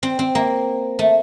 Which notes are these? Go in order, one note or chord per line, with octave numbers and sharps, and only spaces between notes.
C4
C4
A#3
A3